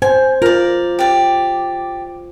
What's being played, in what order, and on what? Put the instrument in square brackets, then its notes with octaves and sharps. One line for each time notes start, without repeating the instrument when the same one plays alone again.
[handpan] C5 [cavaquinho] G#5
[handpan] F4 [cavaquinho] A#4 D5
[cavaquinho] G4 D5